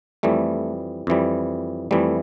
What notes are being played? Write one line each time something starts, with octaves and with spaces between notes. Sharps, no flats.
F2 E3 G3 A3
F2 E3 G3
F2 E3 G3 A3